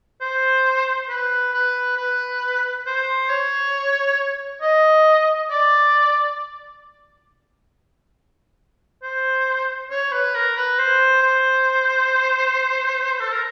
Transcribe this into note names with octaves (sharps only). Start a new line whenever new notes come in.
C5
B4
B4
B4
C5
C#5
D#5
D5
C5
C#5
B4
A#4
B4
C5
C5
A4
A#4